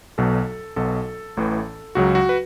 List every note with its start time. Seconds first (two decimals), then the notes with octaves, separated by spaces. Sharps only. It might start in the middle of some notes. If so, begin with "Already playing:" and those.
0.18 B1 B2 F#3 A4
0.76 B1 B2 F#3 A4
1.37 A1 A2 E3
1.95 C#2 C#3 F#3 F#4
2.15 F#4
2.29 B4